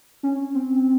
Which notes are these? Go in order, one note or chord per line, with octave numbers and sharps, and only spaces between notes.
C#4
C4